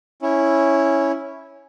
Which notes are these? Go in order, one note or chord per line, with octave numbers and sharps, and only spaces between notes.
C#4 E4